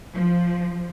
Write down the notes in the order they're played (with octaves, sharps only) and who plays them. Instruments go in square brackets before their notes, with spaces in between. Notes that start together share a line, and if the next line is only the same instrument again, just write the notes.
[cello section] F3